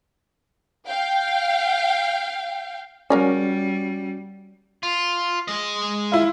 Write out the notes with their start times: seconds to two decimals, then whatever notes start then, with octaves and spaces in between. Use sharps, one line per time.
0.88 F5 G5
3.10 C#3 G3 C#4 F#4 A#4 D5
4.83 F4
5.48 G#3 D#5
6.12 E4 F4